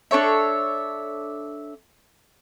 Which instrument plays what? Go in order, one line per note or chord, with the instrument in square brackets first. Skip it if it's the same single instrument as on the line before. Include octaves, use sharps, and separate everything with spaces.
[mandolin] D4 A4 C#5 E5